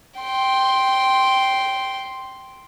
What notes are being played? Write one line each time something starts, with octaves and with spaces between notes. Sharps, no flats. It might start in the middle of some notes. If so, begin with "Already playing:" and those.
G5 C6